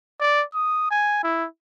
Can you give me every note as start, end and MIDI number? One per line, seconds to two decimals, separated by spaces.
0.20 0.43 74
0.54 0.90 87
0.91 1.21 80
1.23 1.46 64